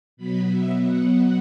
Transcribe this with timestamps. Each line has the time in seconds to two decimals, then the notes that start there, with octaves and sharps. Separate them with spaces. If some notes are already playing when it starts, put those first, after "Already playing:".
0.17 B2 F#3 B3 B5
0.49 E5
0.80 F#5